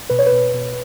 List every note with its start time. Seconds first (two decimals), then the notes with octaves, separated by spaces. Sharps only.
0.10 B2 B4
0.19 C#5
0.27 B4
0.32 B2
0.54 B2